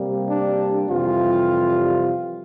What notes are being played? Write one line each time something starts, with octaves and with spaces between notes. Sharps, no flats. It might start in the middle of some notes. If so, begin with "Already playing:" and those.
Already playing: C3 G3 A#3
D4
F2 C3 E3 G3 F4